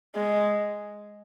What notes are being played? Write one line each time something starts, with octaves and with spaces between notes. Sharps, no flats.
G#3